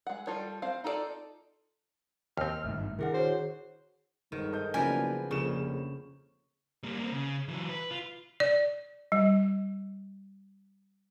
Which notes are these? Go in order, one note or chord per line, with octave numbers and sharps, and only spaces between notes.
G#3 F#5
G3 F4 A4 C#5
C4 C5 F5
D#4 F4 A4 A#4 D5
D#2 C4 F6
G#1 G2 D#3 A3
D#3 D4 E4 G#4 A#4 F#5
F#4 C5 C#5
G1 G#2 D#3
A4 D#5 G6
F#1 C#3 F3 B3 A#4 B4 D5 G#5
F1 A#1 C#3 E7
G3 A#3
A#3 C4
C#3
E3 F#3
B4
F4
D5
G3